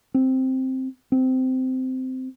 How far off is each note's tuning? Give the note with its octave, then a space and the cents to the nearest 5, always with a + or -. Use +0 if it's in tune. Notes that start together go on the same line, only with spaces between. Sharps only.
C4 +0
C4 -15